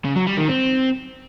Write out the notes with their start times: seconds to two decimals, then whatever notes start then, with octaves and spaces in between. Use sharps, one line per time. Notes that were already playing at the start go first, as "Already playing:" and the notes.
0.05 C#3
0.16 F#3
0.27 G3
0.38 D#3
0.49 C4